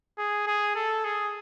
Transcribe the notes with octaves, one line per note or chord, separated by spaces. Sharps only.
G#4
G#4
A4
G#4